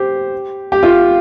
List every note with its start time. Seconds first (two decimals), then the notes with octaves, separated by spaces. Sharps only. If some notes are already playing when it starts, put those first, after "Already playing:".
Already playing: G4 C5
0.72 G4
0.83 F4